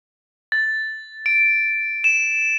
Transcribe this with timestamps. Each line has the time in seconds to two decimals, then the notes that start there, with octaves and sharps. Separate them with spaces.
0.52 A6
1.26 D7
2.04 E7